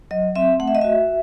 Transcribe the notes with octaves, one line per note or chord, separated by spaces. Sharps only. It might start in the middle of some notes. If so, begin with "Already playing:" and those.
F#3 D#5
C4 E5
A3 F#5
E5
D#5
F#4 E5